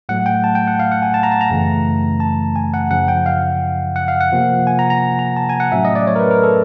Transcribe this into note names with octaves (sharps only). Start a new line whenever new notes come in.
A2 F#3 A3 F#5
G5
A5
G5
F#5
F5
F#5
G#5
A5
A#5
A5
A#5
F#2 C#3 E3 A3
A5
G#5
F#5
F#2 C#3 F3 F#5
G5
F5
F#5
F5
F#5
C3 F3 A#3
G#5
A#5
A#5
A#5
A5
G#5
F#5
A2 F#3 A3 C#4 E5
D#5
D5
C#5
A#4
B4
A#4
A4